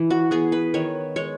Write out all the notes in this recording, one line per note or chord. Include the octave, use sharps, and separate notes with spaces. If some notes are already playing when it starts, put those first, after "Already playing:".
Already playing: E3 E4
F#4
B3 G#4
B4
D#3 C#5
G#3 C#5